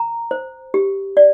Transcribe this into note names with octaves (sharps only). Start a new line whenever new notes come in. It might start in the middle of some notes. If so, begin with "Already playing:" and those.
Already playing: A#5
C5
G4
D5